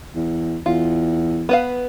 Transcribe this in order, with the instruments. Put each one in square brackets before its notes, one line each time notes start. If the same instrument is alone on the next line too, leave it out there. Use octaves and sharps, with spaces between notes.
[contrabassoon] E2
[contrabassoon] E2 [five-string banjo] F4
[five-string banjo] B3 B4 F5